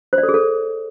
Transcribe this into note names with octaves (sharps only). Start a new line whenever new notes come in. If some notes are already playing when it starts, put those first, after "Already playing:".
C5
D5
A4
G#4
A4